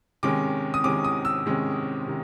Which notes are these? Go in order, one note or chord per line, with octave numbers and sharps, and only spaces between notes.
C3 D#3 G#3 C#4 D6
D#6
C3 D#3 G#3 C#4 D6
D#6
E6
C3 D#3 G#3 C#4
C3 D#3